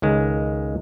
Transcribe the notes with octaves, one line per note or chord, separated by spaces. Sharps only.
C#2 D#3 G#3